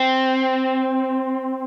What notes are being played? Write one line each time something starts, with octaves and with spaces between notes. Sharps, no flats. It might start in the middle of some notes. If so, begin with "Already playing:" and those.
Already playing: C4